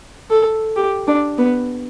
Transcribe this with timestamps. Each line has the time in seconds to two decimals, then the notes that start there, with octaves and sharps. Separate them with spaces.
0.30 A4
0.76 G4
1.07 D4
1.38 B3